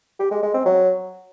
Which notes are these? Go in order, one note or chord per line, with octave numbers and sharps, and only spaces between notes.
G4
G#3
G#3
C4
F#3